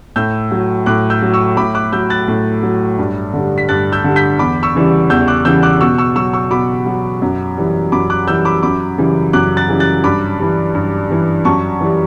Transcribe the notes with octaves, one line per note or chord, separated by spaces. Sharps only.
A2 E6 G6
F#3
A2 D6 F#6
E6 G6
F#3
C#6 E6
A2 B5 D6
D6 F#6
F#3 E6 G6
F#6 A6
A2
F#3
G2
D3 G3
B6
G2 F#6 A6
E6 G6
D3 G3
G6 B6
E2 B5 D6
C#6 E6
C#3 E3 G3
E2 E6 G6
D6 F#6
C#3 E3 G3 E6 G6
D6 F#6
B2 C#6 E6
C#6 E6
F#3 C#6 E6
C#6 E6
B2 B5 D6
F#3
F#2
E3 G3
F#2 B5 D6
D6 F#6
E3 G3 E6 G6
B5 D6
F#2 B5 D6
C#3 E3 G3
F#2 D6 F#6
F#6 A6
C#3 E3 G3
F#6 A6
G2 B5 D6
E3 G3
G2
E3 G3
F#2 A5 C#6
E3 G3